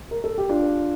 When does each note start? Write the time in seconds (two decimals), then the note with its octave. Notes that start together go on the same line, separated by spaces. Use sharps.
0.11 A#4
0.24 A4
0.38 G4
0.49 D4 F4